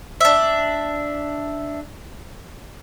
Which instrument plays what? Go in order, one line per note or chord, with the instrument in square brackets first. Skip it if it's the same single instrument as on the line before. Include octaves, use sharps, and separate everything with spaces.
[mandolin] D4 E5